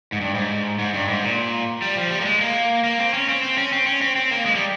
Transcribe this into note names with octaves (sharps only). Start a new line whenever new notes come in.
G#2
G2
G#2
G#2
G2
G#2
A#2
G3
F3
G3
A#3
G#3
A#3
A#3
C4
C#4
C4
C4
C#4
C4
C#4
C4
C4
A#3
G#3
G3